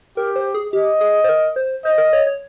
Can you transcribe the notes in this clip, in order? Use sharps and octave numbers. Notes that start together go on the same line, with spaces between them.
G4 A#4
C5
G#4
G4 D#5
G#4
C5
A#4
C5
C5 D#5
A#4
C#5
C#5